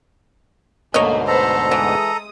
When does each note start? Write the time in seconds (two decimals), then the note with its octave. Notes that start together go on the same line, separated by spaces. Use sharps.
0.94 D2 G#2 B2 A3 A#3 C#5 D#5
1.27 A4 B4 C5 A#5 C6
1.71 E3 G#3 D#6